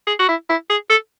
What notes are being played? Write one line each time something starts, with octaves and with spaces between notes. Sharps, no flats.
G#4
F#4
E4
E4
G#4
A4